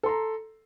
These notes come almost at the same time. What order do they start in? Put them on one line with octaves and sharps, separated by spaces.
A4 C6 A#5